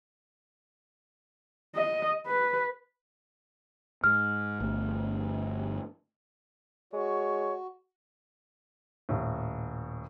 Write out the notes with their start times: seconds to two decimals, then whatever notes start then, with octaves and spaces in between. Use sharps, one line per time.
1.76 D#5
2.26 B4
4.04 G#2 F6
4.60 G1 A3
6.93 G#3 F#4 C#5
9.09 D#1 A2